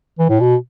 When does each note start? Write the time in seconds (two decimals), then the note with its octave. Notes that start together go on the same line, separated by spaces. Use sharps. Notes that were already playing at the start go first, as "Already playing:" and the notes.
0.19 E3
0.29 A2
0.40 B2